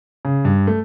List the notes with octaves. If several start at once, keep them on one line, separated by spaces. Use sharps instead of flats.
C#3
G2
A3